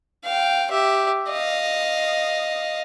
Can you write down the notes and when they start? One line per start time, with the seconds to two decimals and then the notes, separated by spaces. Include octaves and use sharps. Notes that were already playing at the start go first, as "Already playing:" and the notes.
0.25 F5 G5
0.71 G4 E5
1.30 D#5 F5